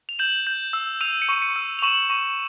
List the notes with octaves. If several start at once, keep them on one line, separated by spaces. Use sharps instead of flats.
F7
G6 E7 F#7
G6
E6
E6 D#7 F7
C#7 D#7
C#6
C#7 D#7
E6
F7
C#6 E7 F#7
C#6